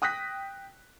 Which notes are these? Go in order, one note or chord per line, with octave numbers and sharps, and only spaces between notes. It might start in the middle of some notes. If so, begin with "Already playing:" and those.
G5 D#6 F#6 A#6 B6